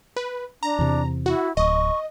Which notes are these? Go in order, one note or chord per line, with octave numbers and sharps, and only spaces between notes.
B4
D4 A#5
E2 C3
E4 F#4
D1 D#5 C#6